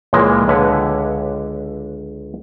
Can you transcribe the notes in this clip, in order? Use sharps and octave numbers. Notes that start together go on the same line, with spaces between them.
C#2 A#2 E3 F3 G#3 A#3
C#2 D3 B4 C#5